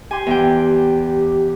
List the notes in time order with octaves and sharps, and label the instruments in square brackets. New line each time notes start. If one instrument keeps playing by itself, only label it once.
[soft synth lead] G4 [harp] G#5 C6
[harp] E2 G5